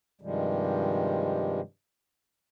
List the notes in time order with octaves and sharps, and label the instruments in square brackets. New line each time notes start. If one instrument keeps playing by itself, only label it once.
[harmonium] G2 C3 D#3 F3 G3 G#3